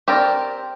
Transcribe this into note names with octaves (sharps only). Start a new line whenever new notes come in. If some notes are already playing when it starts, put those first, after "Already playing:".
C4 G4 A#4 D5